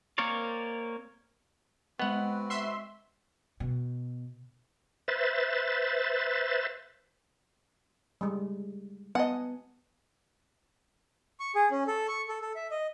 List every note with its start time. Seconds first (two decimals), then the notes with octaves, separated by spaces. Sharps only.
0.18 A#3 C4 A#4 C#5 D5
1.99 G#3 B3 C4 F#4 B4 D#5 F#5
2.50 E5 C6
3.60 B2
5.08 B4 C5 E5 A6
8.21 G3 G#3
9.15 B3 D#5 F#5 G#5 A5
11.40 C#6
11.55 G#4
11.71 C#4
11.87 A4
12.08 C#6
12.29 A4
12.42 A4
12.56 E5
12.71 D#5